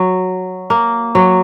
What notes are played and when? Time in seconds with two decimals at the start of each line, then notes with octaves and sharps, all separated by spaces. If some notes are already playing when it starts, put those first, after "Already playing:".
Already playing: F#3
0.70 A#3
1.15 F#3